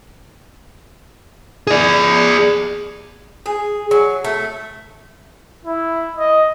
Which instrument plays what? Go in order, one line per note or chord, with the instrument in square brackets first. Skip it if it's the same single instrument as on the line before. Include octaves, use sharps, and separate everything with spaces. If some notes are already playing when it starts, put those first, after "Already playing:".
[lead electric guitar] G#4 D5
[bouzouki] G#4
F#3
A3
[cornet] E4
D#5